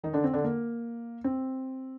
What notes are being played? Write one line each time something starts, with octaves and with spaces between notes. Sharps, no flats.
D#3 D#4
D3 D4
C4
D3 D4
A#3
C4